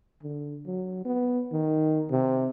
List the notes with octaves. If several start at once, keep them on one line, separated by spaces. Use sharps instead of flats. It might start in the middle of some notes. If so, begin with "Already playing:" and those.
D3
F#3
B3
D#3
C3